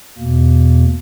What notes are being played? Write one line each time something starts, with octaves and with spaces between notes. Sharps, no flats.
E2 B2 A#3